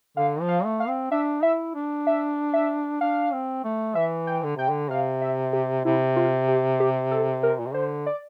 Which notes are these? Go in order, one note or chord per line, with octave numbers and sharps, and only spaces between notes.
D3 F5
F3
F5
A3
F5
C4
D4 E5
E4 E5
D4
E5
E5
D4 F5
C4
A3
E3 E5
G5
D3
C3 G5
D3
C3 F5
E5
G4
C3 E4
F4
G4
G4
A4
A#4
A#2
C3
D3 C5
D5